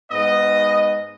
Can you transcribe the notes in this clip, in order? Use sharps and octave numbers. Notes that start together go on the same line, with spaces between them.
G#2 B3 D#5